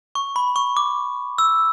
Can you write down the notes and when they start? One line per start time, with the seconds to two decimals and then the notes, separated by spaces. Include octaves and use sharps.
0.15 C#6
0.36 B5
0.56 C#6
0.77 D6
1.38 E6